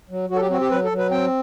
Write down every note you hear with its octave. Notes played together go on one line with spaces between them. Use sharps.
F#3
F#3 F#4
A4
G4
C4 F#4
G4
F#3 B4
A4
F#3
B4
C4 G5